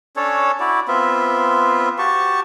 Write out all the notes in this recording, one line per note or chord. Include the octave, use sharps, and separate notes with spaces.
C#4 D4 A4 C#5
E4 F#4 D5
B3 C4 F4 E5
F#4 G4 A5 C#6